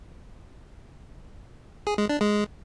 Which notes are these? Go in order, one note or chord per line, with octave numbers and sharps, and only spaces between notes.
G#4
G#3
D4
G#3